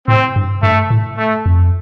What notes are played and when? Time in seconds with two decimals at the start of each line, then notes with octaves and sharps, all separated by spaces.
0.08 A2 C4
0.36 G2
0.63 G2 A3
0.90 A2
1.18 A3
1.46 F2